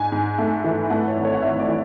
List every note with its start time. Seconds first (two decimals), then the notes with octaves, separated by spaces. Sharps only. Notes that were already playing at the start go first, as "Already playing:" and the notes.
Already playing: G#2 G#5
0.12 G#2
0.38 A3
0.64 E3
0.90 A3 F#5
1.08 C#5
1.17 G#1
1.25 C#5
1.34 F#5
1.42 G#1 E5
1.59 D5
1.68 E3